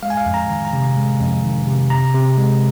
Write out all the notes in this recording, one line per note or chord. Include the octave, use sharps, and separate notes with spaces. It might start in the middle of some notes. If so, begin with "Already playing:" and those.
G#3 F5
G#5
F5
F2
A#5
D#3
A#5
C3
G#3
F2
D#3
C3
C3 A#5
C3
G#3